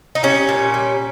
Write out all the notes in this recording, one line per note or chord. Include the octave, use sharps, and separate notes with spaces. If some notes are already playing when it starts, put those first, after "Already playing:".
D#4
G3 C#4
A#2
G3